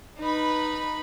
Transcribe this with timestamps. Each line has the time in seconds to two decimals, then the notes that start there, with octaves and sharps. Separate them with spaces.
0.19 D#4 B4 B5